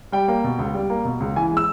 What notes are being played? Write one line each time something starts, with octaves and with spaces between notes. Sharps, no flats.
G3 G5
A#3
B2
C#2
G3
A#3
B2
C#2
E3 G#5
G#3
E6